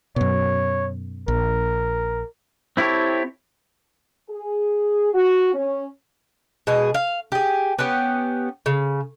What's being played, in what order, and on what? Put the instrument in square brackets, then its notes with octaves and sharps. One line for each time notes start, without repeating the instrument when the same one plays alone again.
[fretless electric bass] F#2 B2 [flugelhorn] C#5
[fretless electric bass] A#1 [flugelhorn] A#4
[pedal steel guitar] C4 E4 G4 A4 C#5
[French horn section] G#4
F#4
C#4
[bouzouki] B2 G#3 G#4
F5
G4 G#4
B3 C#4 G4
C#3